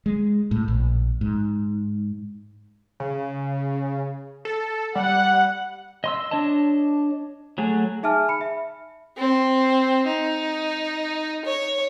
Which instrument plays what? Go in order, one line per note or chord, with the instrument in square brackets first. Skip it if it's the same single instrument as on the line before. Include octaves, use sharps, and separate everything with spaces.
[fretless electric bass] G#3
A2
A#1
G#2
[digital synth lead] C#3
A4
[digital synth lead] G3 [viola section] F#5
[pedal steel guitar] D#5 C6 E6
D4 C#5 D#5 A5
F#3 A3 G#4
[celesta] D#4 G#4 E5 G#5 A5 F6
B5 C#7
E5
[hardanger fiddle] C4
D#4
C#5